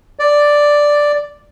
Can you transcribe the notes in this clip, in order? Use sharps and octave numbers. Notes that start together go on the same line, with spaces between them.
D5